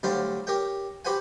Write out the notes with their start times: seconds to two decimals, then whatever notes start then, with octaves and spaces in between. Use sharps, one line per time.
0.03 D2 D3 F#3 G3 C5 F5
0.47 G4 A#4 C#5 G5
1.05 F#4 G4 B4 C5 F#5 G#5